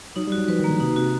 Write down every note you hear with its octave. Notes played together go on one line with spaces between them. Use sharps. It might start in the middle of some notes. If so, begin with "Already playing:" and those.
F#3 D#4
G3
F#4
F#3
F3 B4
D#3
A#3
D3
C3 D#4
C3 F#4